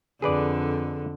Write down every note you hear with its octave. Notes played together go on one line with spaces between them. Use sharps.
F2 D3 G#4 B4 D5